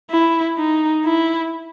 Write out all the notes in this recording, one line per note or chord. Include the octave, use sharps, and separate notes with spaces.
E4
D#4
E4